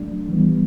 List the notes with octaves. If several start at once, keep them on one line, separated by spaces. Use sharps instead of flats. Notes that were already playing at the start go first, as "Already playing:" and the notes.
Already playing: F#3 A3 D4
E3 G3 B3